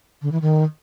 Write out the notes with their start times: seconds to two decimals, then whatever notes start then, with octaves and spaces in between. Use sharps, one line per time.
0.22 D3
0.32 E3
0.42 D#3